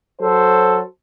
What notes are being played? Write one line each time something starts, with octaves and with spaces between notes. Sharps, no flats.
F#3 A4 C5